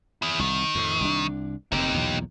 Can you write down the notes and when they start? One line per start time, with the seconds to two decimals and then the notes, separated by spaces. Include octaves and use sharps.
0.22 E4 G#4
0.39 C2 D#3
0.75 F2 A2
1.01 C2 D4
1.72 F1 F#2 C4 D#4 G4
1.94 B1 E2 A#2